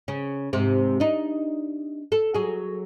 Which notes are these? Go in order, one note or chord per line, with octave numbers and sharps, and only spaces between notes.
C#3 C#4
G#2 C3 C4
D4 D#4
A4
F#3 G#4